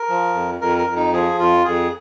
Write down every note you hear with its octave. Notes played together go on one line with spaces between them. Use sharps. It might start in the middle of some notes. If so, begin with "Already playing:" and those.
Already playing: A#4
F3
F2
F2 A#4
A#4
F2
D#4
F3 G#4
F2 F4
F2 G#4